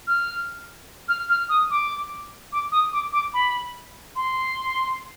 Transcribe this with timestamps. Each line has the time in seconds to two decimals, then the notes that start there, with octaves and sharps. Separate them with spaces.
0.07 F6
1.08 F6
1.29 F6
1.49 D#6
1.71 D6
2.52 D6
2.72 D#6
2.93 D6
3.13 D6
3.34 B5
4.16 C6